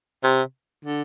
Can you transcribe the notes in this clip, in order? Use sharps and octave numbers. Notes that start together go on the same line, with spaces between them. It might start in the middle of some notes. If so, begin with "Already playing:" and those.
C3
D3